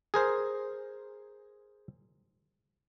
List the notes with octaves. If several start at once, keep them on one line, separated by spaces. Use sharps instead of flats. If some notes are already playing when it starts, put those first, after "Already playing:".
G#4 A#4 C5